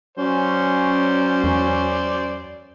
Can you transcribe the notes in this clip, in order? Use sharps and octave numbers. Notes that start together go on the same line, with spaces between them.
F#3 C#4 C5 D5
E2